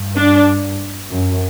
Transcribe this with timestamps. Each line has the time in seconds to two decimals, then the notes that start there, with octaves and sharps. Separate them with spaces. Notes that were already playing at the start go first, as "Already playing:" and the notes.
Already playing: G2
0.17 D4
1.11 F#2